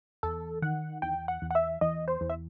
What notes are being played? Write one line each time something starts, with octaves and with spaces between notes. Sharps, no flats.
E2 A4
D#3 F#5
E2 G5
F#5
E2
F#5
E5
E2 D#5
C5
E2
E5